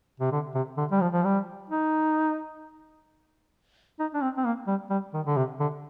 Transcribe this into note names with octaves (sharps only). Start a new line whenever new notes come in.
C3
D3
C3
D3
G3
F3
F3
G3
D#4
D#4
D4
C4
C4
A#3
G3
G3
D#3
D3
C3
D3